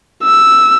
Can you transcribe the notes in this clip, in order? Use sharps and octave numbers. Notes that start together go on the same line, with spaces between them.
E6